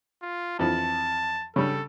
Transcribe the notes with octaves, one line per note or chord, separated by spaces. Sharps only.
F4
F2 E3 F3 A5
C#3 G3 A4